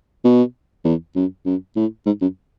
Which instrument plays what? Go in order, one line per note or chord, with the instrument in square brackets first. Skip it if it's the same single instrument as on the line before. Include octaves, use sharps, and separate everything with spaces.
[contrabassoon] B2
E2
F#2
F#2
A2
G#2
F#2